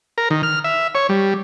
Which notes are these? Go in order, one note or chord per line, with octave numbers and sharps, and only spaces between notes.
A#4
D#3
F6
E5
C#5
G3